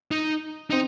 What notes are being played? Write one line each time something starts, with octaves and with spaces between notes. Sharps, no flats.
D#4
C4 D#4